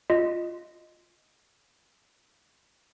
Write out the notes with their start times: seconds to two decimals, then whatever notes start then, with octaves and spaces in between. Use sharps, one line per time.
0.10 F4 D#5